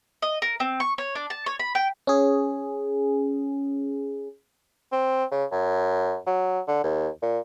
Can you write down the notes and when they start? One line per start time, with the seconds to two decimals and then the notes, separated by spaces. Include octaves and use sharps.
0.22 D#5
0.42 A#4
0.60 C4
0.80 C#6
0.98 C#5
1.15 D4
1.30 A5
1.46 C#5
1.59 B5
1.75 G5
2.07 C#4 G#4
4.92 C4
5.31 C#3
5.52 F#2
6.26 F#3
6.68 D3
6.84 D#2
7.22 A#2